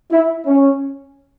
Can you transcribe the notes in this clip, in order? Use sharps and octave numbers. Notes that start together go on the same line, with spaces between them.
E4
C#4